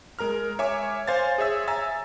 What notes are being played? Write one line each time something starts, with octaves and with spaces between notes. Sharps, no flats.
G#3 A#4 A#5 F6
C#5 E5 G#5 D6
C5 F5 G#5 A6
G#4 C#5 E5 E6
E5 G#5 A#5 E6 A6